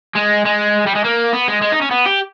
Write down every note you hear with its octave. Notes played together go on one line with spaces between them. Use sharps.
G#3
G#3
G3
G#3
A#3
B3
G#3
G#3
D#4
C#4
B3
G4